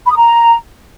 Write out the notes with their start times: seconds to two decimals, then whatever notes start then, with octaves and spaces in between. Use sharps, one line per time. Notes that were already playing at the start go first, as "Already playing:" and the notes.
0.06 B5
0.11 D#6
0.16 A#5